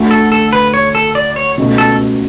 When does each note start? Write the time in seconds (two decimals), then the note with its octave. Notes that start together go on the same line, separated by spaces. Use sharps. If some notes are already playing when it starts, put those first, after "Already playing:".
Already playing: D2 D3 A3
0.11 A4
0.32 A4
0.53 B4
0.74 C#5
0.95 A4
1.15 D5
1.36 C#5
1.57 C#2 B2 A3
1.78 A4